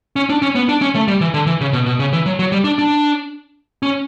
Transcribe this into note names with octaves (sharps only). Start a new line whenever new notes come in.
C#4
D4
C#4
B3
D4
C#4
A3
G3
E3
D3
E3
C#3
B2
B2
C#3
E3
F#3
F#3
G3
D4
D4
C#4